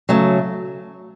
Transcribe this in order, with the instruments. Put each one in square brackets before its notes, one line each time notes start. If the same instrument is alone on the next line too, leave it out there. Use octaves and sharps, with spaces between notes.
[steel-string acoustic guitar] C#3 F#3 A3